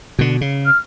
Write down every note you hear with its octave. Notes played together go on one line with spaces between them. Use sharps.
B2 D3
C#3
F6